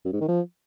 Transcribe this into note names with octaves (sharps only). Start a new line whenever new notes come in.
F#2
G#2
D#3
F3